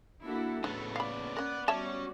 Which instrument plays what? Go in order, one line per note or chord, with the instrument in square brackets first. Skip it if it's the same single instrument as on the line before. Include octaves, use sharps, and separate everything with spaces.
[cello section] A#3 E4 A4 [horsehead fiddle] D4 F#4
[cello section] A2 A3 A4 [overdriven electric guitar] C#3 B3 [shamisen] F#3
[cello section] A#3 [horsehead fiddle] D5 [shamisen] F5 B5
[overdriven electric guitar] B3 F#5 [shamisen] C#4 A#4
[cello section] G3 B3 F#4 [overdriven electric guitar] C#4 [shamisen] C#5 E5 A5